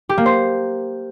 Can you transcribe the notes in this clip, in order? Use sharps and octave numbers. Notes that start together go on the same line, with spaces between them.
G4
A#3
C5